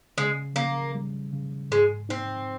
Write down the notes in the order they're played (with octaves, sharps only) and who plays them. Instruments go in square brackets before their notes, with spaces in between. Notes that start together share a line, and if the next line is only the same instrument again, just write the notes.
[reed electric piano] C#3 [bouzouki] G#3
[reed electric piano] C#3 [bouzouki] A#3
[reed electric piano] G3
C#3
[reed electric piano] G#2 [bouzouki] G#3
[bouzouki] C4 [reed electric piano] D#4